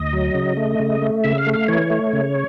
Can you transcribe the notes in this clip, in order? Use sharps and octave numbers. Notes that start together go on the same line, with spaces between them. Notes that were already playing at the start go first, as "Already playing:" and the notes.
Already playing: D2 D#5
F#3
C#3
A3
C#3
A3
C#3 E5
F5
A3
F5
E3 C#5
A3
C#3